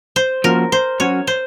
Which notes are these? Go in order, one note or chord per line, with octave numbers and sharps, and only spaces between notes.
C5
F3 A#3 C#4 F#4 A#4
C5
F#3 C#4 F#4 C#5
C5